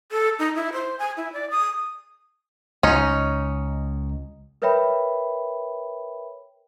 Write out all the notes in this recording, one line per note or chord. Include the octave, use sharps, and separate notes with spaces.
A4
D#4
E4
C5
G#5
E4
D5
D#6
C#2 C#4 D#4
A#4 B4 C#5 E5 G5 B5